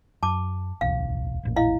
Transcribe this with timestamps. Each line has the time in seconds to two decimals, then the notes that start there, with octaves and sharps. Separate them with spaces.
0.23 F#2 A5 D6
0.81 D1 B1 E2 F5
1.43 E1 A1 A#2
1.56 E4 D#5 F5